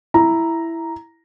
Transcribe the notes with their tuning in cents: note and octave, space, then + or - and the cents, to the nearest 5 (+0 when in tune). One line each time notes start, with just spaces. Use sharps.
E4 +5 A#5 +0